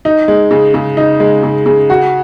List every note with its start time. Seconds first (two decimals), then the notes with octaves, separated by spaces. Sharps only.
0.05 D#4
0.28 G#3
0.51 C#3
0.74 C#3
0.97 D#4
1.20 G#3
1.43 C#3
1.66 C#3
1.90 F#4